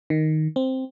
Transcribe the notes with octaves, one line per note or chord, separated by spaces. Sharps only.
D#3
C4